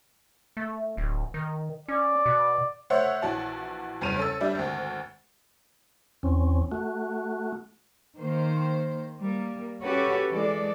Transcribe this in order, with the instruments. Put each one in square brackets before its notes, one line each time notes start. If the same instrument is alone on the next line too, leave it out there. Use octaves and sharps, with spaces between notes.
[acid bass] A3
D1
D#3
[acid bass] C#4 [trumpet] D5
[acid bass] B2
[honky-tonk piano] A3 C5 C#5 E5 F#5
A#1 E3 F#4 A5
F#1 E2 G2 C#3 D#7 F7
C#4 A4 E6
G3 D4 E5
G#1 D2
[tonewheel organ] E2 C4 C#4
A3 F#4
[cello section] D#3 A#3 C5
G3 A#3
C#4 F#4 G4 A4 B4 C#5
E3 G#3 A4 D5